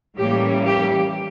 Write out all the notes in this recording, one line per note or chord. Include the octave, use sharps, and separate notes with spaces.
A2 E3 G3 A#3 C#4 G4
G4